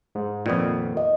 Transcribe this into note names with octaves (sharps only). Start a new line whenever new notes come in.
G#2
F2 A#2 D#3 B3
D#5